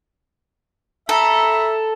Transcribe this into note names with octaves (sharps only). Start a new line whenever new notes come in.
A4 E5 A#5 B5